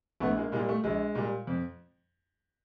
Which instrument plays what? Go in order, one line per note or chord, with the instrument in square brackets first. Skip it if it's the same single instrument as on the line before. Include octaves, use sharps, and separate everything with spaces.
[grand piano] A#1 A3 B3
G#3 A#3
A#2 G3 G#3 A#3
A3
A#1 G#3
A#2 G3
F2